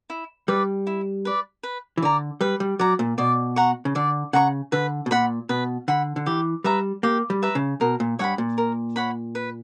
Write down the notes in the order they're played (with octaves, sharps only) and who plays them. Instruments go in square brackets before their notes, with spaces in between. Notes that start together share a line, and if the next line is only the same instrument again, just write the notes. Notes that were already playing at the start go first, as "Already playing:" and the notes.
[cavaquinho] E4
[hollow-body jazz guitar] G3 [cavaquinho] B4 D5
[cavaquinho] E4
B4 D5
B4
[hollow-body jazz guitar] E3
[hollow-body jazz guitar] D3 [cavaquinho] D5 A#5
[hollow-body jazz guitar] G3 [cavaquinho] B4
[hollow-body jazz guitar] G3
[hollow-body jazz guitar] F#3 [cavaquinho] D5 A#5
[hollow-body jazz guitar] A#2
[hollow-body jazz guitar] B2 [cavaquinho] D5
[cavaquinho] F#5 A#5 C#6
[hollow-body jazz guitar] C#3
[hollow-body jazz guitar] D3 [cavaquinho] D5
[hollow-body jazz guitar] C#3 [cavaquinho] F#5 A#5 C#6
[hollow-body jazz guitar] D3 [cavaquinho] B4
[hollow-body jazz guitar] B2
[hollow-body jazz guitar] A#2 [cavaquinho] F#5 B5
[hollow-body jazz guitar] B2 [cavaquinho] B4
[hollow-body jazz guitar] D3 [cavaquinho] F#5 B5
[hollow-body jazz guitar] D3
[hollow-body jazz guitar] E3 [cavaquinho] G4
[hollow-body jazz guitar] G3 [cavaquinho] B4 E5 A#5
[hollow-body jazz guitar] A#3 [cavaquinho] G4
[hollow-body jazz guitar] G3
[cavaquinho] B4 E5 A#5
[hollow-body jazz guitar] C#3
[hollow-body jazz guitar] B2 [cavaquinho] A#4
[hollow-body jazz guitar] A#2
[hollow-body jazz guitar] G2 [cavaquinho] C#5 F#5 B5
[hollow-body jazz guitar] A#2
[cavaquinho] A#4
C#5 F#5 B5
B4